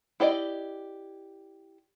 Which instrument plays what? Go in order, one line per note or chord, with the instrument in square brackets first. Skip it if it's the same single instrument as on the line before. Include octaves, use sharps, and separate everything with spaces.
[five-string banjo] E4 G4 D5 D#5